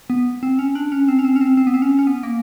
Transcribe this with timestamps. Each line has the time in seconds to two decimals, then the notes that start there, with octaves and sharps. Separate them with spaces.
0.10 B3
0.43 C4
0.59 C#4
0.75 D4
0.92 C#4
1.08 C4
1.19 C#4
1.25 C4
1.36 C#4
1.41 C4
1.57 C4
1.67 B3
1.74 C4
1.82 C#4
1.99 C#4
2.07 B3
2.23 A#3